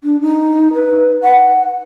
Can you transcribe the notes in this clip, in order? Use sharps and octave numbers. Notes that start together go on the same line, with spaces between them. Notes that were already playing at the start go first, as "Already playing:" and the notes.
D4
D#4
B4
F#5